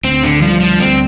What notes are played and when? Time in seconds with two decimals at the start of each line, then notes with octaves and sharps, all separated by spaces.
0.04 D2 C4
0.23 D3
0.42 F3 G3
0.61 F3
0.80 D2 C4